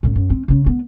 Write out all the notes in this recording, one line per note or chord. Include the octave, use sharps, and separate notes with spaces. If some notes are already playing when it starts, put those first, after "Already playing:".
A1 A2
F#2
C4
C#3 C#4
B3